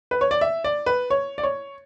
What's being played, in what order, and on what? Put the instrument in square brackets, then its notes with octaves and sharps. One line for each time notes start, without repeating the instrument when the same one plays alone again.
[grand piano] B4
C#5
D5
E5
D5
B4
C#5
D5
C#5